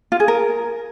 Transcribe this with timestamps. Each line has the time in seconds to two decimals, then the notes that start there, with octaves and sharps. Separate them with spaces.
0.12 F4
0.20 G#4
0.28 A#4